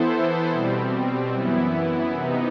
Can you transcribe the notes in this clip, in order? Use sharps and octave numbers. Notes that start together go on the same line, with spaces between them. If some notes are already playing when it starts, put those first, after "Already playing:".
Already playing: E3 B3 E4 A4 C5
B2 G3 C4
F#2 E3 B3 E4
C3 E3 B3 D#4